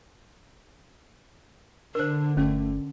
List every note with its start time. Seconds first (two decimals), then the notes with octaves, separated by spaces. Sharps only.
1.95 D3 D4 A#4 C5
2.37 G1 A3 C#4